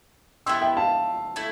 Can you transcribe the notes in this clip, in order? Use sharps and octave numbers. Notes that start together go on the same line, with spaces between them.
B3 E4 G4 C6 E6
E5 G5
F5 A5
A3 E4